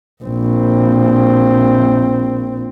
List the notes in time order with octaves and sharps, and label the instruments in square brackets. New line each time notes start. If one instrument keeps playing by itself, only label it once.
[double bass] A#1 C4